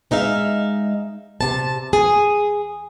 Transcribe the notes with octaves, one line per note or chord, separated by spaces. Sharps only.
G#3 D#4 E5 F5
C3 A5
G#4